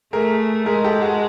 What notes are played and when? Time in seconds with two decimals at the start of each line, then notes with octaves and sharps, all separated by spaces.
0.13 A3 G#4 A#4
0.66 G#3 G#4 A#4
0.84 G4 A4
1.02 F#4 G#4